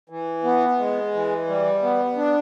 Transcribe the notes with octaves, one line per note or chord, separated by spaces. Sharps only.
E3
B3
G#3
E3
G3
B3
D4